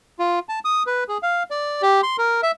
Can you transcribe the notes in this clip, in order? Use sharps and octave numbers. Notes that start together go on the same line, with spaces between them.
F4
A5
D#6
B4
G#4
F5
D5
G4
C6
A#4
E5